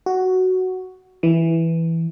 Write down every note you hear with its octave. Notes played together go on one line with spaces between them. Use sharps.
F#4
E3